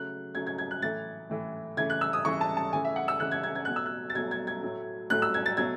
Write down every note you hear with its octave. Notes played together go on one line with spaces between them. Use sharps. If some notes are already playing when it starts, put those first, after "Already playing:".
Already playing: C#3 F#3 A3 F#6
C#3 F#3 A3 G#6
G#6
G#6
F#6
A2 E3 A3 A6
A2 E3 A3
C#3 E3 A3 G#6
F#6
E6
D#6
C#3 E3 A3 C#6
A5
A5
C#3 E3 A3 G#5
E5
F#5
E6
C#3 E3 A3 F#6
G#6
G#6
G#6
B2 F#3 A3 F#6
E6
F#6
A6
B2 F#3 A3 G#6
G#6
G#6
A2 F#3 A3
A2 F#3 A3 F#6
E6
G#6
A6
B2 F#3 A3 G#6